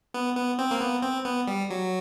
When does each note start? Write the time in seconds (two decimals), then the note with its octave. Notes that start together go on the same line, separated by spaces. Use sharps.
0.14 B3
0.36 B3
0.59 C4
0.71 A#3
0.81 B3
1.02 C4
1.25 B3
1.47 G3
1.70 F#3